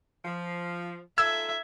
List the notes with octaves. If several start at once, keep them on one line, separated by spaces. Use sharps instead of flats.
F3
D#4 F4 A4 E5 E6 G#6